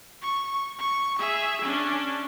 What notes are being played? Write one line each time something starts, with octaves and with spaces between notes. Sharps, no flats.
C#6
C#6
G#4 E5
C#4 D4